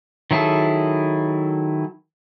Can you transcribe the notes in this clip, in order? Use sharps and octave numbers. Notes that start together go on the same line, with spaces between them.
D#3 F#3 E4 G#4 A4